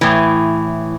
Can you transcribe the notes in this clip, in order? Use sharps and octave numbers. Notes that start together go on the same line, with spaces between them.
A2 E3